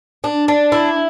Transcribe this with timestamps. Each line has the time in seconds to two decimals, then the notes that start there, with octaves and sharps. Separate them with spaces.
0.24 D4
0.48 D4
0.72 E4